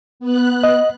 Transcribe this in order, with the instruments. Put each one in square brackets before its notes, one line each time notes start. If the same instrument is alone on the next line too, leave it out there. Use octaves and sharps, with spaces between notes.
[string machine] B3 F#6
[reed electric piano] D#5